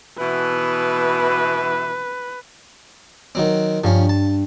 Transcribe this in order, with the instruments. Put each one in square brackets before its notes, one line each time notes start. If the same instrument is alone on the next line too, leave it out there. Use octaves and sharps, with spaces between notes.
[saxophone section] B2 E3 [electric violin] B4
[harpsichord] D#3 F#3 C4
[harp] G2 [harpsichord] F3 C#4
[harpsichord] A5